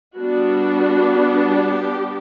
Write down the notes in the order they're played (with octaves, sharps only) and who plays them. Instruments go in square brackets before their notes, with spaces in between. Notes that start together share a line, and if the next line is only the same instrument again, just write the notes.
[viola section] G3 B3 D4 F#4
G4